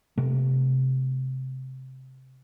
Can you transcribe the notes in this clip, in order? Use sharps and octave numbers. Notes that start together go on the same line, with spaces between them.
C3 A3